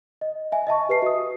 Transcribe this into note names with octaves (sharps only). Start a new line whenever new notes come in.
D#5
E5 G#5
D#5 E5 A5 C#6
G4 B4 D#5 C7
F#4 D#6